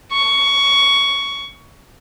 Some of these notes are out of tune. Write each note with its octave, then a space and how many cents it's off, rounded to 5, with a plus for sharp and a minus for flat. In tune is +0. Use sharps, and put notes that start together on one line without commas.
C#6 +15